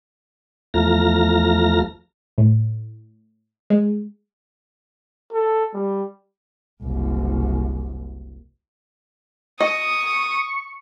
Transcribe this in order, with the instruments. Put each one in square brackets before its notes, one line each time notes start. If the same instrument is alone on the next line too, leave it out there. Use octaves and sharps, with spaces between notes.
[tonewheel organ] E2 F3 A3 A#5 F6 A#6
[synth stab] A2
G#3
[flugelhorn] A4
G3
[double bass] F#1 C2
[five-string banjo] D#5 [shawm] C#6 [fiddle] D#6